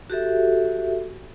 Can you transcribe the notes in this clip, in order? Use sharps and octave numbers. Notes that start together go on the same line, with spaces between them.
F#4 G4 A4 E5